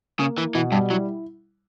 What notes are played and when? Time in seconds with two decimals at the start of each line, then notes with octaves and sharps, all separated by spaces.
0.20 C#3 A#3
0.37 E3 E4
0.55 B2 E3
0.72 G2 G3
0.90 F#3 E4